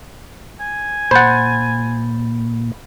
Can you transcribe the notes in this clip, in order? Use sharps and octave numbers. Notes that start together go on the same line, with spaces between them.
G#5
A#2 C5 F#5 B5 G6 A6